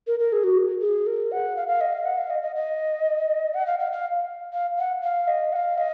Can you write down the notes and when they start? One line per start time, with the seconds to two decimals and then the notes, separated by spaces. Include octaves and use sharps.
0.07 A#4
0.19 A#4
0.33 G#4
0.44 F#4
0.81 G#4
1.07 A#4
1.32 F#5
1.57 F5
1.68 F5
1.81 D#5
1.93 F5
2.05 F#5
2.18 F5
2.30 D#5
2.42 D#5
2.56 D#5
3.54 F#5
3.67 F5
3.79 F5
3.92 F5
4.53 F5
4.79 F#5
5.04 F5
5.28 D#5
5.53 F#5
5.56 F5
5.78 D#5